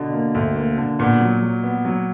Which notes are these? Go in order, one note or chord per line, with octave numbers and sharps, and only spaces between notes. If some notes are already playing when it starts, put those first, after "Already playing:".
Already playing: B2 D3
A#3
D2
A#3
D3
A#2 B3
F#3
F#3
B3
F#3